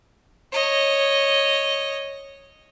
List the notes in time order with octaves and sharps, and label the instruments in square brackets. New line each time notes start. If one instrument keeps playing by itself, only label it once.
[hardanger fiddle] C#5 D#5